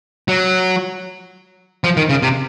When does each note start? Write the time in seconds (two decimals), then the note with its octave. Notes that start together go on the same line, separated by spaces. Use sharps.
0.28 F#3
1.84 F3
1.97 D#3
2.09 C#3
2.23 C3